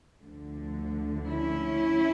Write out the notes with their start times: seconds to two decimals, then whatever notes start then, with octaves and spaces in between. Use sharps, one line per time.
0.23 D2 D3 F3
1.27 C#4 E4